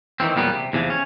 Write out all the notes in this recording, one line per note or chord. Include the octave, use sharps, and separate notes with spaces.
D#3 E3 F#3 C4
E2 A#2 F#3 G3 B3
C3
E2 C3 E3 F3
C#4